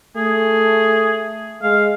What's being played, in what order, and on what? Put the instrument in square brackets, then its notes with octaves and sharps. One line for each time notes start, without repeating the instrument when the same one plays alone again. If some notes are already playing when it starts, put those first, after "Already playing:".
[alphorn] A3 [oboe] G#4
[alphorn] G#3 [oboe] F5